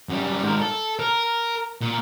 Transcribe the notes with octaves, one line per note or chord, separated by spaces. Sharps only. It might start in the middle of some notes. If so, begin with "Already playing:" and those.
F#2 G3
G#2 A#4
A4
A#4
A#2